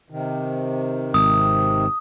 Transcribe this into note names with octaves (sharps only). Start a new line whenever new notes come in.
C3 D#3
G#1 D#6